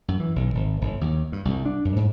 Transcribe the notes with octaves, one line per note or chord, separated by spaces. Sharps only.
F#2
E3
B1
G#1
G1
D#2
G2
C2
D4
F#2
G#2